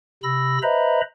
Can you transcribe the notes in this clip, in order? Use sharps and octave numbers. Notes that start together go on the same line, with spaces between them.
C3 B5 E6 A#6
B4 C5 D#5 E5 A#5 B5